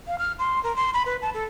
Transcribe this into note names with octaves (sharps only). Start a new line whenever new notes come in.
F5
F6
C6
A#4
C6
B5
B4
A5
A4